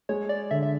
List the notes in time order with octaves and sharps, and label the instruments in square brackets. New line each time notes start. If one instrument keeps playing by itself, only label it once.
[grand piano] G#3 [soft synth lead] C#5
[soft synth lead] D5
[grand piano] D3 [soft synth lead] E5
[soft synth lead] E5